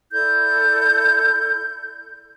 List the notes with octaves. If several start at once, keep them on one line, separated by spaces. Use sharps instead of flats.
E4 A4 D5 G6